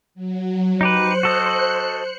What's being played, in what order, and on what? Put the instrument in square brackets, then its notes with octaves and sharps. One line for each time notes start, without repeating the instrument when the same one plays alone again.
[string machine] F#3
[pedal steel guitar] D#4 G4 B4 [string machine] C5 F#6 C#7
[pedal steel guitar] F#4 A4 D#5